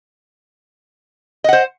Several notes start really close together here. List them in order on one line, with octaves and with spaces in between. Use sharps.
D#5 F#5 C5